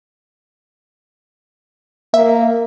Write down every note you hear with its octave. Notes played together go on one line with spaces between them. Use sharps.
A#3 E5